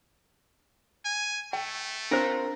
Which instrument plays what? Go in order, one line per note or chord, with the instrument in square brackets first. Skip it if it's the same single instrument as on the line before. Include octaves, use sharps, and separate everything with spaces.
[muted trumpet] G#5
[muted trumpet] A3 [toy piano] G5
[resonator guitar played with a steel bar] C4 F4 A#4 [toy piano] D4 C5